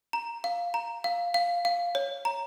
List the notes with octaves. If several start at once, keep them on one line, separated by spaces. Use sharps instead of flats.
A#5
F5
A#5
F5
F5
F5
C#5
A#5